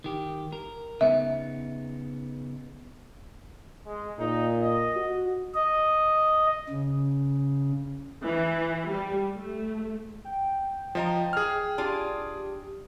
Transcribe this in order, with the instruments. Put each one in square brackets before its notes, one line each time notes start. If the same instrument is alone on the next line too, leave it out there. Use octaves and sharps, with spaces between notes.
[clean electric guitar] D#3 G4
A#4
[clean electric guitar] C#3 B3 D#4 [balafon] E5
[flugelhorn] G#3
[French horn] A#2 [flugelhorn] D#4
[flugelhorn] D#5
[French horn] F#4
[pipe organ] D#5
C#3
[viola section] E3
G3
A3
[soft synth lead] G5
[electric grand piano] F3 [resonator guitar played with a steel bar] C5 D#5 A#5
[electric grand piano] G#4 F6
[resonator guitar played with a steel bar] D4 F4 G#5 [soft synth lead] G4